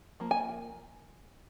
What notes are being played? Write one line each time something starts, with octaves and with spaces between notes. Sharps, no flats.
F3 A#3
G#5